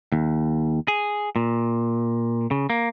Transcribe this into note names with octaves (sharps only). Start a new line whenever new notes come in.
D#2
G#4
A#2
C#3
A#3